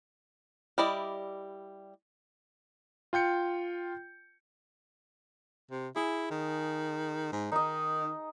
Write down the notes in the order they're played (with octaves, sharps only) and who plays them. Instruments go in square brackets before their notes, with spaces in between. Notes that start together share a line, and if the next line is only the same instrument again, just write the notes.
[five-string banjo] G3 E4 D5 D#5
[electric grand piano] F4 G5 G6 C#7
[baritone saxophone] C3
[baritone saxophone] E4 [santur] G#4
[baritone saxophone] D#3
G#2
[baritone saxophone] D#3 [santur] D#4 D#5